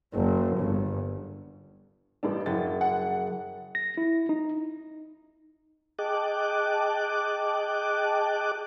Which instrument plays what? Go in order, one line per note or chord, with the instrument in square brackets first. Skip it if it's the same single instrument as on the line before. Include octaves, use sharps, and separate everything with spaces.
[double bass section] F#1
G1
[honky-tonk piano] A1 G2 D4
[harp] F#1 [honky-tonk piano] A6
[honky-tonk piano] F#5
[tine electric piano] A#6
E4
D#4
[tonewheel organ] G#4 D#5 G5 A5 D6 F#6